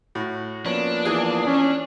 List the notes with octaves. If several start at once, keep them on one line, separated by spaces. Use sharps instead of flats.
A2 F#4
F3 A#3 B3 C#4 D4
E3 G#4
C#4